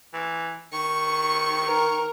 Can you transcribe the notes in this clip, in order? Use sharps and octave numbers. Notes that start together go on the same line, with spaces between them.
E3
D#3 C#6
A#4